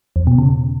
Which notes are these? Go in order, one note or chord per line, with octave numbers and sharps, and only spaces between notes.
E2
B2
C#3